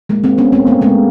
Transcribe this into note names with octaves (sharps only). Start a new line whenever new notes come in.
G#3 A#3
A#3 C4
B3 C#4
A#3 C4
A3 B3
G#3 A#3